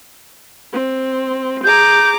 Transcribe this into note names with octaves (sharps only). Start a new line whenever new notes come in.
C4
G#4 A#5 D6 G6